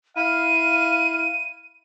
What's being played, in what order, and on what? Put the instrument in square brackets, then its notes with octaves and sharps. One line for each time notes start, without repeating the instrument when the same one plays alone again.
[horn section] E4 F5 [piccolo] D#7